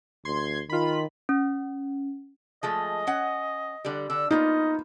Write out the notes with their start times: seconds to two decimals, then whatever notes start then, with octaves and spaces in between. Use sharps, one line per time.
0.25 D2 C6 G#6
0.70 D#3 F4 B5
1.29 C#4
2.63 F3 G#3 A3 D#5
3.07 C#4 F#5
3.85 D3 G3
4.10 D3 E6
4.31 A#3 B3 D#4 F4 D#5